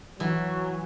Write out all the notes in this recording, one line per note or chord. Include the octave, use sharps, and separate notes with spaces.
E3 F#3